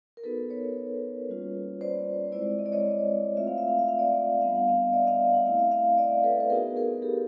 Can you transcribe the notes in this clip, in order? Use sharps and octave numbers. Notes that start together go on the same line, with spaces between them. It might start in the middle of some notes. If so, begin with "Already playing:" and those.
A#4
B3 D#4 F#4 A4 B4
B4 C#5
G3 A#3 C#4 F4
C5 D5
G#3 C4 E4 C5 D5
D#5
D5
C#5 D#5
A3 C4 F4 E5
F5
E5
F5
E5
F5
D5 E5
G3 B3 D4 F5
F#5
D#5 F5
D5 E5
D#5 F5
F#5
A3 C4 E4 F5
E5
D#5 F5
D5 E5
A4 B4
B4
B3 D#4 F#4 G#4 A#4
G#4 A#4
G4 A4